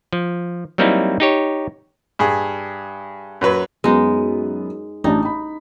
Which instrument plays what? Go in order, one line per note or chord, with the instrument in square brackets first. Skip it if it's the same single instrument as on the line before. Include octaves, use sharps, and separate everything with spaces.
[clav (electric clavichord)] F3
F#3 G3 A#3 C4 D#4 E4
D#4 G4 C#5
[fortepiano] G2 G#4
F#2 F#3 B4
[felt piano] F#2 B3 [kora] G#3 D#4
[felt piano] A1 D4 [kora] D#4
[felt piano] B5